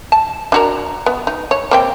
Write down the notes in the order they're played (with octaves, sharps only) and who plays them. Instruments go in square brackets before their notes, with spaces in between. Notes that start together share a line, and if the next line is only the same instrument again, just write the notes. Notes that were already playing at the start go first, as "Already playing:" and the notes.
[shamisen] A5
D4 F#4 A#4
B3
D#4
C#5
A#3 C4 G5